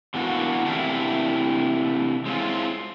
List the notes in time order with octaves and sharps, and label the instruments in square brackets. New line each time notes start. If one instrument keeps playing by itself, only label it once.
[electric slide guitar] B2 D3 E3 A#3 D4 F#4
C3 E3 A3 A#3 D4 E4
G#3 C4 C#4 E4 F4